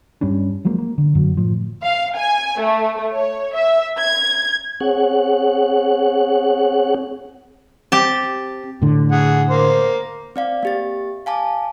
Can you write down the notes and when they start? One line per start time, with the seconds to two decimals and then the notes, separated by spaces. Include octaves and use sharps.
0.21 G2 G3 C#4 D4
0.65 F3 F#3 G#3 A#3
0.78 A#3
0.98 D3
1.15 F#2 D3 F#3
1.37 A2 F3
1.84 F5
2.17 G#5
2.60 A3
3.12 C#5
3.55 E5
3.99 G#6
4.80 C4 G#4 C#5 F#5 F#6
7.92 C4 G4 A5
8.82 A2 D3
9.12 G#4 F#5
9.50 A#3 C5
10.36 C4 D5 F5
10.63 A#3 G4 A6
11.26 F5 G#5 A5 D6